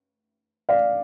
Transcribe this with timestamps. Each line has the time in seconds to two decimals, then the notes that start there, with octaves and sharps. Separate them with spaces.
0.69 D5 F5